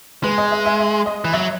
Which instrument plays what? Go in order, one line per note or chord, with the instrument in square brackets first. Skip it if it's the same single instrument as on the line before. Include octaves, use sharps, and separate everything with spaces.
[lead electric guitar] G#3 [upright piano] B4
[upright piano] D#5
E5
E5
E5
D#5
[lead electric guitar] E3
[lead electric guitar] F#3 [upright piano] E5